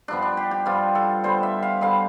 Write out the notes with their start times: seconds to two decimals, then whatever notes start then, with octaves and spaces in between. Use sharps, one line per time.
0.08 G2 F3 B3 D4
0.22 D4
0.37 G4
0.51 G4
0.65 G2 F3 B3 F4
0.95 A4
1.23 D3 G3 B3 C5
1.43 E5
1.62 F5
1.81 D3 G3 B3 F5